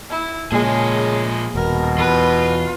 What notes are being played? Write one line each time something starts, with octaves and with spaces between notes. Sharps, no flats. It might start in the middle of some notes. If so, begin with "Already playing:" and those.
E4
A#2 C#3 F3 G#3 G#4
D#1 B2 A#4
E2 F4 B4